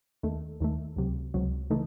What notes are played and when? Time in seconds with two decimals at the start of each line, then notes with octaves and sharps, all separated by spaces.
0.23 D#2 D#3 A3
0.60 D#2 D#3 A3
0.96 C#2 C3 F#3
1.34 C#2 C3 F#3
1.70 C#3 E3 A3 D#4